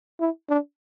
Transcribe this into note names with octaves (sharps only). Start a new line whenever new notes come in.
E4
D4